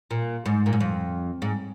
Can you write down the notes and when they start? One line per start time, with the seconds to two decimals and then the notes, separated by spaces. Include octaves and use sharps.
0.11 A#2
0.46 G#2
0.66 A#2
0.73 G#2
0.80 F2
1.42 G#2